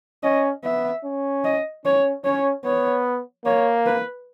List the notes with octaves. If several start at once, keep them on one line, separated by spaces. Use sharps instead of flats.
C#4 D#5
B3 E5
C#4
D#5
C#4 C#5
C#4 C#5
B3 C#5
A#3 C#5
B4